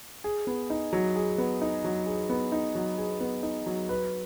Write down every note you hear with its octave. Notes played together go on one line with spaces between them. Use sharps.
G#4
B3
D#4
F#3
G#4
B3
D#4
F#3
G#4
B3
D#4
F#3
G#4
B3
D#4
F#3
B4